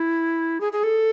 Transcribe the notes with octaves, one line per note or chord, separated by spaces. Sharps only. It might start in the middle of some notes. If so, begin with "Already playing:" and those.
Already playing: E4
G#4
G#4
A4